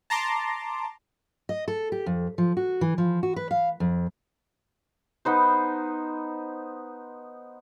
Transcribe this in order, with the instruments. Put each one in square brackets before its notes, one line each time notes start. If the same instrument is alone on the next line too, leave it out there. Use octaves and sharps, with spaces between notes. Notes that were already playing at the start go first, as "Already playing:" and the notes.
[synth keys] A5 A#5 C6 D6
[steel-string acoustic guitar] D#5
A4
G4
F2
F3
F#4
E3
F3
F#4
B4
F5
F2
[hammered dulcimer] B3 D#4 C5